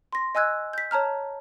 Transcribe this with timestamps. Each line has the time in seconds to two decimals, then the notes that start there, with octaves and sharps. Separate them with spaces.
0.12 C6 A#6
0.35 D#5 G#5 E6 F#6 G#6
0.73 G6 B6
0.91 C#5 A5 A#5 F6